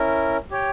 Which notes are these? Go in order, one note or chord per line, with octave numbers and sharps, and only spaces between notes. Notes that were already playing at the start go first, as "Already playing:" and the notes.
Already playing: C#4 E4 A#4
G4 C#5 G5